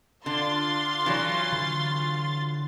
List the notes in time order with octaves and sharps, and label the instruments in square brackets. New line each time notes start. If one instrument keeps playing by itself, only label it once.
[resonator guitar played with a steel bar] D3 [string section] F4 C6 A6
[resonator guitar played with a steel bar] E3 F#3
[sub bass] D3